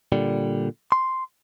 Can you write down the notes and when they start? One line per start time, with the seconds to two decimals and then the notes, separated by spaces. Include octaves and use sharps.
0.12 A#2 D3 G3
0.92 C6